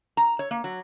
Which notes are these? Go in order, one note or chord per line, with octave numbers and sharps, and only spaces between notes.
A#5
C#5
A#3
F#3